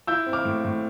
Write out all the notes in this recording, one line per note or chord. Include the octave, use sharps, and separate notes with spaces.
E4 E6 G6
C4
D6 F6
A2
A2